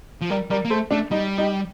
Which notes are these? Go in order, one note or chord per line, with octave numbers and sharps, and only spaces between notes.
F3
G3 A#4 D5
G3 A#4 D5
A#3
A3 A4 C5
A3 D4
G3 D#4
D#4 G4